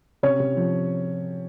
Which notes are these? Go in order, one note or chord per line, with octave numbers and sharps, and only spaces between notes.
C3 C#4 C#5
C3
F3